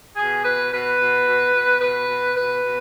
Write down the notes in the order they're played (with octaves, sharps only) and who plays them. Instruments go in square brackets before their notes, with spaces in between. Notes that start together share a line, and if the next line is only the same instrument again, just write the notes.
[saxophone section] B2 G#4
B2 B4
B2 B4
B2
B2
B2
B2 B4
B2
B2 B4
B2